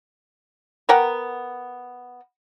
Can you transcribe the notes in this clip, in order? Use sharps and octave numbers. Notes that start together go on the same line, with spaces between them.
B3 A#4 F#5 G5